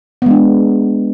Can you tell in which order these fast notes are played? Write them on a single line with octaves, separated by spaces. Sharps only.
B3 G#3 D4